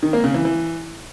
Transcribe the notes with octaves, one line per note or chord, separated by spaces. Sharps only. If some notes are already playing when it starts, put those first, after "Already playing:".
D#3
A#3
C#3
E3
E3